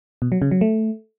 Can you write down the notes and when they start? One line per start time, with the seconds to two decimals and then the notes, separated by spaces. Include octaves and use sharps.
0.22 B2
0.32 F#3
0.42 C#3
0.51 F#3
0.61 A3